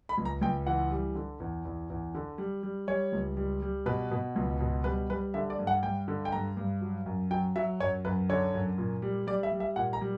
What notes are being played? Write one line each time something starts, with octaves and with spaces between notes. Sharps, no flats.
B5
C#2
A#5
C#2 G5
E3 F#5
G3
D3
E2
E2
E2
D3
G3
G3
G3 C#5
C#2
G3
G3
B2 B4
B2
C#2
B2
G3 B4
G3 B4
D3 E5
D5
G2
F#5
G2 G5
D3
G5
G2 A#5
G2
F#3
F#2
F#3 G5
F#3 E5
F#2 C#5
F#2 B4
D3 C#5
F#2
A#2
G3
G3 D5
E5
G3
E5
A#2 F#5
A#5
G3